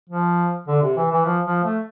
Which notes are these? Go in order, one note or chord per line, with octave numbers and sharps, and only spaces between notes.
F3
D3
C3
E3
E3
F3
F3
A3